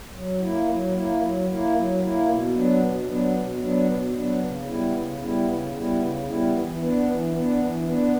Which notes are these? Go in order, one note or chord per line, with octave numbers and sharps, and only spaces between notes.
F#3
A#3 E4
F#3
A#3 E4
F#3
A#3 E4
F#3
A#3 E4
B2
F#3 B3 D4
B2
F#3 B3 D4
B2
F#3 B3 D4
B2
F#3 B3 D4
C#3
G3 B3 E4
C#3
G3 B3 E4
C#3
G3 B3 E4
C#3
G3 B3 E4
E3
B3 D4
E3
B3 D4
E3
B3 D4